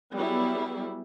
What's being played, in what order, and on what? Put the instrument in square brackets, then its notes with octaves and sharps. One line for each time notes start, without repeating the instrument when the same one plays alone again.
[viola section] F#3 G3 B3 E4 G#4